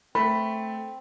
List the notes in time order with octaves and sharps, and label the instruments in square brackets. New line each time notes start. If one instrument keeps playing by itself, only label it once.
[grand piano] A3 [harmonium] C4 [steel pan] B5